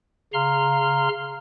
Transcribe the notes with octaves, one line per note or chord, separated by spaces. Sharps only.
C#3 F5 A#5 C6 F6